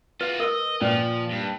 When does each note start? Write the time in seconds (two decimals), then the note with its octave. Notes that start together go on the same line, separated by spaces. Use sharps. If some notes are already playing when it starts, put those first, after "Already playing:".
0.21 F4 F#4 B4
0.40 A#4 D#5 E6
0.81 A#2 F3 C#4 B4
1.30 G2